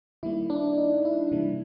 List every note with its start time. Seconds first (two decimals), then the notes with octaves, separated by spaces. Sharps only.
0.23 D#3 G3 A#3 E4
0.50 D4
0.78 D#4
1.05 E4
1.32 C3 E3 G3 A#3